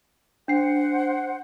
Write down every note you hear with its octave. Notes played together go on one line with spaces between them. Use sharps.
D4 C5 F#5 C7